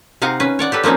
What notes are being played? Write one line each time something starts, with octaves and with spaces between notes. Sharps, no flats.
C3 D#4 F5 F#5 G#5
C#4 B4
C#5 D5 F#5
G4 A4 B4
F3 A#3 C4 C#4 D#4